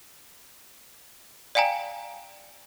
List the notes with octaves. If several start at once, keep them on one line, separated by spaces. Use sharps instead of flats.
D5 F5 G5 G#5 A#5